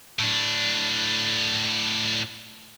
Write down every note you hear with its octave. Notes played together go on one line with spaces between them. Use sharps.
A2 D4